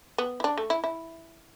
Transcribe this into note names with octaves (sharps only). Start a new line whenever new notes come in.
B3
E4
D4
A3
E4
E4